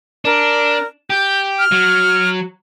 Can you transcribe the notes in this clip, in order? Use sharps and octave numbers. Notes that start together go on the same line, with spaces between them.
D4 A#4
G4 G6
F6
F#3